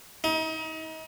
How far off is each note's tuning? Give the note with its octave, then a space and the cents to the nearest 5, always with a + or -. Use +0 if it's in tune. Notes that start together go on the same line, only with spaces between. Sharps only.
D#4 +35